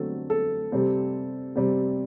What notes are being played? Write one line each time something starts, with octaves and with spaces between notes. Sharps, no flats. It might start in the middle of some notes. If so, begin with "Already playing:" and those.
Already playing: D3 F#3 A3 C4 A4
A4
C3 G3 C4
C3 G3 C4